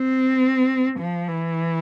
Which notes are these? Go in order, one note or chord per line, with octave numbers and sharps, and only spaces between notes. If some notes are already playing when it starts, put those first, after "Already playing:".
Already playing: C4
F3
E3